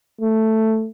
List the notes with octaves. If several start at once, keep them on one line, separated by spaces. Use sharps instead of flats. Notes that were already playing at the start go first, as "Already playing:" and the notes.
A3